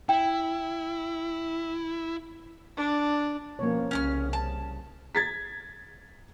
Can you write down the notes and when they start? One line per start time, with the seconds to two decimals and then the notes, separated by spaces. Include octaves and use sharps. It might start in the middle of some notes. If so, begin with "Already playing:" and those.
0.09 E4 G5
2.77 D4
3.59 B2 F3 A#3 C#4 C#5
3.91 C2 C#3 C#4 A#5 F6
4.33 A5
5.15 G#6 A6 B6